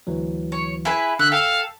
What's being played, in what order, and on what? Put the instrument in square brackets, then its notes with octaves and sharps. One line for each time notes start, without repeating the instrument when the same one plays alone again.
[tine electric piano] D2 E3 F#3
[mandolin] C#5
E4 G#4 B4
[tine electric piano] D3 [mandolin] E5 [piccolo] F#6
[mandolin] A4 [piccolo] F5 [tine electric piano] G5 E6